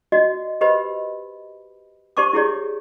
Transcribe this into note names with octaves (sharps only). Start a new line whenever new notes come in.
F#4 D5 D#5
G4 B4 C5 D#5 B5
G4 C5 D5 A5 C#6 D6
E4 G4 G#4 C#5 D5